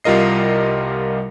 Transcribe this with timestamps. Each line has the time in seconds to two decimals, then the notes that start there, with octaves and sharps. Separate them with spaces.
0.04 C2 G3 F4 A#4 D#5 C7